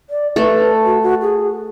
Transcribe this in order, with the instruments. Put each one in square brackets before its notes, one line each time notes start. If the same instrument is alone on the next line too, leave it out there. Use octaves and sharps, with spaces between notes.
[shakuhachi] D5
[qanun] A3 A4 [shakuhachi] B4
[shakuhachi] F#4
F#4
G#4